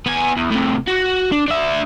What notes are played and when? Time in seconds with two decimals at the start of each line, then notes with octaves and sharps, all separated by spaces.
0.06 B3 G#5
0.37 E2
0.51 A2 C3
0.88 F#4
1.32 D4
1.48 D4 E5